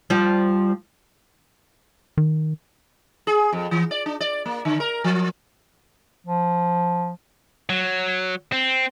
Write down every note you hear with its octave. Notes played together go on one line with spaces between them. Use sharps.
F3 G3
D#3
G#4
F2
E3
D5
D4
D5
A#3
D3
A#4
F3
F3
F#3
C4